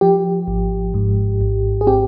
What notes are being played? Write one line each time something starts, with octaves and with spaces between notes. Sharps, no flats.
F3 G4
G#1
G#2
G#1
G#4
C4 G4